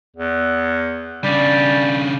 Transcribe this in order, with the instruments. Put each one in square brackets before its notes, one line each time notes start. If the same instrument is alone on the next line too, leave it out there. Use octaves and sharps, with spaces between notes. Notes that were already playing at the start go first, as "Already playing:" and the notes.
[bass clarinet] E2
[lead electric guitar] C#3 D4 [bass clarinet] G3